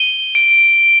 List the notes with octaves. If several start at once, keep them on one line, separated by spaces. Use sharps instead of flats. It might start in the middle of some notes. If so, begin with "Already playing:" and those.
Already playing: D#7 G7
D7